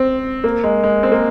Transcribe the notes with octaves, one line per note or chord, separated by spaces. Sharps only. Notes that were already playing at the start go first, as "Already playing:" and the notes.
Already playing: C4
A#3
G#3
G#3
C4
A#3